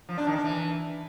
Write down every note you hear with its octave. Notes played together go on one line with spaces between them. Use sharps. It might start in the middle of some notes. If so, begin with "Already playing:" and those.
F3
D4
D#3
D4
E3